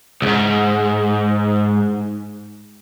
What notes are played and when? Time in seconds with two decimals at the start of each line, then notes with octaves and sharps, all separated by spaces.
0.22 C#2 G#2